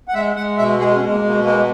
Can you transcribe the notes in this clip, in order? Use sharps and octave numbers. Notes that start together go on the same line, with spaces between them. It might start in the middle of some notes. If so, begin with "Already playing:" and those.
F#5
G#3 E5
G#3 F#5
B2 E5
G#3 G#4
C#4
G#3
A#3
B2 A#3
G#3 A#3